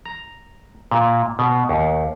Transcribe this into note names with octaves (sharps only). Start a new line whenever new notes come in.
A#5
A#2
B2
D#2